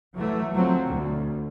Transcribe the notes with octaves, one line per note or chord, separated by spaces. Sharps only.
E3 F#3 A3
F3 F#3 C4
D2